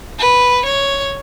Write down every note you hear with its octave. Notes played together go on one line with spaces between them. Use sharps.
B4
C#5